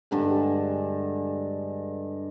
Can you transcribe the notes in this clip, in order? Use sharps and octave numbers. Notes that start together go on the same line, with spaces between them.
G2 D3 G#3